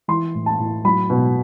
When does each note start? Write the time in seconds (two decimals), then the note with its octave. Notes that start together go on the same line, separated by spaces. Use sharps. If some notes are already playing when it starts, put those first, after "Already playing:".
0.08 E3 C6
0.34 A2
0.46 A5
0.59 A2
0.85 F#3 B5
1.10 B2